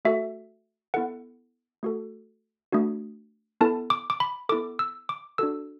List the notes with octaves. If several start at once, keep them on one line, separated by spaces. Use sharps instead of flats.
A3 F#4 A4 E5
B3 E4 A4 F#5
A3 F#4 A4
A3 D4 F#4
B3 E4 A4 A5
D6
D6
B5
B3 E4 A4 D6
E6
D6
D4 F#4 A4 E6